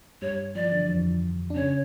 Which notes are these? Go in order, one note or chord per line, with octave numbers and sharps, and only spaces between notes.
G2 G3 C#5
F3 D5
E3
D3
E3
F2 F3
D4
C#3 C#4 C#5